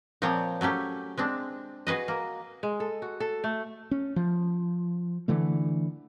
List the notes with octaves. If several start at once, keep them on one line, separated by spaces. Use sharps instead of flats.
A#2 F3 C4 C#5 D5 G5
F#3 A3 C#4 G4
G#3 C4 D4
F#4 G#4 B4 D#5
A#3
G#3
A4
F#4
A4
A3
C#4
F3
D3 E3 A3